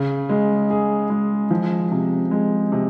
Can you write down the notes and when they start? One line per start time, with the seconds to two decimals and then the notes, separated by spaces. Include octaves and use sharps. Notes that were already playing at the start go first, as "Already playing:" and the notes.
Already playing: C#3
0.29 G#3
0.70 G#4
1.10 G#3
1.50 F3
1.92 C3
2.31 G#3
2.72 C3